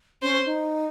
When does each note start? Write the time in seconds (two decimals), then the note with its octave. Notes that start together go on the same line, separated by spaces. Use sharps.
0.22 C#4 C5
0.46 D#4